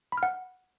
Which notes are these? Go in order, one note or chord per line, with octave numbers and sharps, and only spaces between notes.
B5
F6
F#5